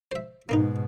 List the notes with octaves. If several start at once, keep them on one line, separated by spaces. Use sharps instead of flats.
C5 E5
G#2 B2 A#3 B3 D#4